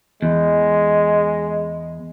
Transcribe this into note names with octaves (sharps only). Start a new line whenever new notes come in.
E2 G#3